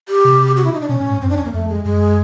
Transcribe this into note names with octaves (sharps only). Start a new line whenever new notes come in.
G4
C3
F#4
E4
D#4
D4
B2 C#4
A2
G#2
F#2 C4
D4
E2 C#4
A#3
F2 A3
G#3
F#2 G#3